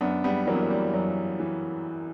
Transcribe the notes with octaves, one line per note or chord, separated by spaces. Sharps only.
F#2 B3 D4
G3 B3
E3 F#3 A#3
B3
A#3
G3
F#2 F#3
E3